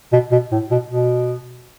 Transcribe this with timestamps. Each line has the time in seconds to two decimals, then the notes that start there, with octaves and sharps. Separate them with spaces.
0.13 B2
0.32 B2
0.52 A2
0.71 B2
0.90 B2